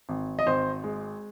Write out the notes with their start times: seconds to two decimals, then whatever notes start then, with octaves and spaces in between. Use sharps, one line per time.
0.09 G#1
0.39 D#5
0.47 G#1 C5
0.84 G#3